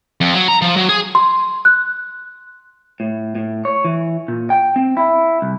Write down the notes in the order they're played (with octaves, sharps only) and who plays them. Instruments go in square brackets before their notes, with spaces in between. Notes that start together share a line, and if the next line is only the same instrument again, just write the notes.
[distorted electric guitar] F2
F#3
A#5
F3
F#3
G#4
[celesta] C6
F#6
[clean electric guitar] A2
A2
C#5
E3
A#2
G5
C4
E4
C2